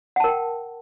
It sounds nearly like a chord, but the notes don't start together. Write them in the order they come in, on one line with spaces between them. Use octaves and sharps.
F#5 A5 A#4 G5